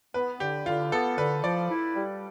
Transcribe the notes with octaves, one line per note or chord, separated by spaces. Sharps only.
B3 B4
D3 G4
D3 F4
B3 A4
D3 B4
F3 D5
E4
G3